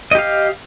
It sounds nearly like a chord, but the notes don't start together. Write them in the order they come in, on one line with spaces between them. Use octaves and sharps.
D#5 G4 F5